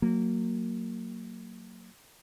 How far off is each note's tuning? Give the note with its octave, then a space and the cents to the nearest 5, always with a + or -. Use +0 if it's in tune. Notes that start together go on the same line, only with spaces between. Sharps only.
F#3 +0 A#3 -20